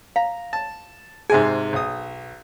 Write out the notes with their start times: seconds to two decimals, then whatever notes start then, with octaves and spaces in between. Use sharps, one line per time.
0.16 F5 A#5
0.53 A5
1.30 G#2 C3 G#4 G#5
1.73 B1 D#6